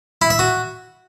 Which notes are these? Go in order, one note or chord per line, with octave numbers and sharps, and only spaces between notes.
E4
E5
F#4